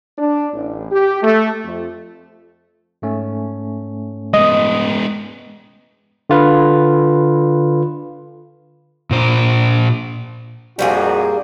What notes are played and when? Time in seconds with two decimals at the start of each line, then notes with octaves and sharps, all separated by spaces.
0.18 D4
0.53 A1
0.91 G4
1.22 A3
1.64 F2
3.02 G#2 A3 C#4
4.34 G#3 B3 D#5
6.30 D3 F4 B4
9.11 A#2 C5
10.79 A#1 F2 G3 A#3 F#4 G#4